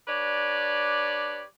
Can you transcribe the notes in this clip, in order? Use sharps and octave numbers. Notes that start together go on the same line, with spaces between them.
D4 G4 B4 C#5 D5